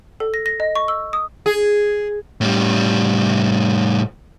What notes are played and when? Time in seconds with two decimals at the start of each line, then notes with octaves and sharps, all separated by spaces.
0.20 A4
0.34 A#6
0.46 A#6
0.60 D#5
0.76 C#6
0.88 E6
1.13 D#6
1.46 G#4
2.41 A2 G3